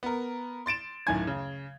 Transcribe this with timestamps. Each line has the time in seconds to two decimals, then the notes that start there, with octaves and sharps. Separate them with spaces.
0.03 B3 A#4
0.66 C6 A6 D7 E7
1.07 D1 F#2 D#3 G#5 G#6
1.27 C#3